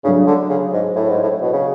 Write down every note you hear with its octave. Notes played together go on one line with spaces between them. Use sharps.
C#3 F#3 A3 D4
D3
C#3
G#2
A2
G#2
A2
B2
C#3